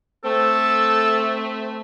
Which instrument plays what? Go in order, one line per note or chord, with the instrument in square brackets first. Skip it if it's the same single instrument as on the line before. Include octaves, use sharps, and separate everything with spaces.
[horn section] A3 [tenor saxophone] C4 [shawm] A4